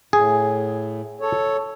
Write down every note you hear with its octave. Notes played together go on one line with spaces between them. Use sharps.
A2 G#4
A4 C#5